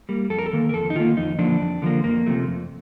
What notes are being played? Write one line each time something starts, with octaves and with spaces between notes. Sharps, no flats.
G3 A#3
F2 A4
A#4
A4
D#3 A#3
A#4
F2 A4
D#4
D#3 A#3 F4
F2 D#4
D3 F3 A#3 D4
F2
D3 F3 A#3
F2 A#3
C3 F3 A3
F2